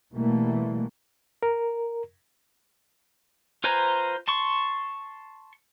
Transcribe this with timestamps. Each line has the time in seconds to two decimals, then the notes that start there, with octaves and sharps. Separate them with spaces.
0.14 B2 E3 G3 A3 A#3
1.43 A#4
3.64 F4 B4 C5 G#5 A#5
4.28 A5 C6 C#6